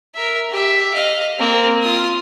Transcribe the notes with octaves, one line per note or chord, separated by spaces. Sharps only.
A#4 E5
G4 E5
D#5 F5
A#3 C4
F4 D#6